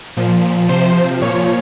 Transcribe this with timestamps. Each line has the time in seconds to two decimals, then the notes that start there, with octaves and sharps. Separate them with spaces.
0.17 A#2 F3
0.69 C3 F3 C5
1.22 A#2 F3 C#5